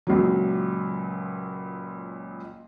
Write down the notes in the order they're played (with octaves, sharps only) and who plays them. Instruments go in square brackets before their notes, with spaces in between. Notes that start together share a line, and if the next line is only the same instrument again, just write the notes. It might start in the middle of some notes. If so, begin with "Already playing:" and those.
[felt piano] C#2 A#2 F#3